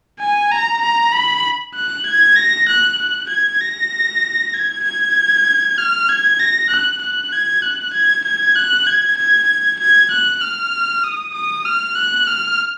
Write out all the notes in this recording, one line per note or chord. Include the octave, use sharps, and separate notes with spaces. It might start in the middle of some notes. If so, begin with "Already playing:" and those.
G#5
A#5
A#5
B5
F#6
G#6
A#6
F#6
F#6
G#6
A#6
G#6
G#6
F6
G#6
A#6
F#6
F#6
G#6
F#6
G#6
G#6
F#6
G#6
G#6
G#6
F#6
F6
D#6
D#6
F6
F#6
F6